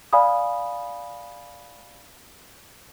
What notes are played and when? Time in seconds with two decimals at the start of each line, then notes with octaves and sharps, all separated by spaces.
0.13 D5 F5 G#5 B5 D#6